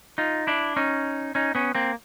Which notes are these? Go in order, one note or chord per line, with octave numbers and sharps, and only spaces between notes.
D#4 F4
D4 E4
C#4 D#4
C#4 D#4
B3 C#4
A#3 C4